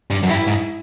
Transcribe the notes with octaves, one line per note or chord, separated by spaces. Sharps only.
G2
F#2
G2 E4
G#2